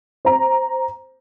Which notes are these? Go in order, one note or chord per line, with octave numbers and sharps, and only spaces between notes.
C5 A#5